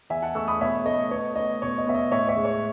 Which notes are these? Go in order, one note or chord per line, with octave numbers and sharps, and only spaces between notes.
E2 E5 G#5
F#5 A5
A3 C#6 E6
B5 D#6
B2 C#5 E5
A3 D#5
B3 C#5
B3 D#5
B2 C#5
D#5
B3 E5
D#5
A2 C#5 E5
C#5 E5
G#3
C#5